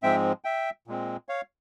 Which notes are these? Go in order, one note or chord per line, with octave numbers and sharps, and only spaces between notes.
G#2 F3 G#3 C4 E5 G5
E5 G5
A#2 G#3 C4
C#5 F5